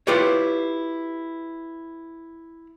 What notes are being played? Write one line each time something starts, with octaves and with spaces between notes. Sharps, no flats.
E4 F4 G4 B4 C#5